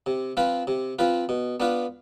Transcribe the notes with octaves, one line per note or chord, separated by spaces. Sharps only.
C3
F3 C4 F4 B4
C3
F3 C4 F4 B4
B2
B3 D4 F4 B4